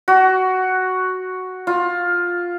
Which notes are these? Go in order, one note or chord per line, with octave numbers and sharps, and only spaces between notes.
F#4
F4